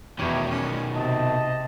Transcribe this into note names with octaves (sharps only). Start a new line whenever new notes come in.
E2 B2 D#3 G4 C#5
G3 G#3 C#4 G4
C3 D#5 A5